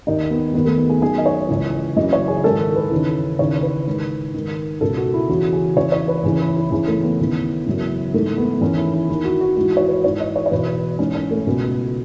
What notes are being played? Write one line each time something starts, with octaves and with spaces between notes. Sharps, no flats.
D#2 D#3 D#4
B3
D#2 D#3 B3
A3
B3
G#4
F#2 D#3 G#4
D#5
C#5
C#2 C#3 E3
F#2 C#3 E3 D#5
C#5
G#4
G#2 D#3 A4
B4
D#2 C#3 E3
D#2 C#3 E3 C#5
B4
G#2 D#3
G#2 D#3
C#2 B2 A4
F#4
E4
E2 C#3 E3 F#4
G#4
E2 C#3 E3 C#5
C#5
B4
E2 C#3 E3 G#4
E4
E4
E2 C#3 E3 G#4
A3
B3
D#2 C#3 E3
F#2 C#3 E3
G#2 E3 A3
B3
E2 D#3 C#4
E4
E4
D#2 D#3 E4
F#4
F#4
G#2 E3 F#4
C#5
B4
G#2 E3 C#5
D#5
C#5
C#5
E2 B2 B4
G#2 E3 C#4
C#4
A3
C#2 B2 B3